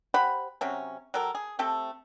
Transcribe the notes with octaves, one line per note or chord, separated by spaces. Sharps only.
G4 C5 F#5 B5
C3 F#3 C#4
F#3 G4 A4 A#4
G#4
A3 C4 G4 A4